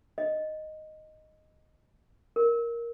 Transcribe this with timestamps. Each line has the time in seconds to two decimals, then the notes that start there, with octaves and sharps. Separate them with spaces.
0.18 D#5
2.36 A#4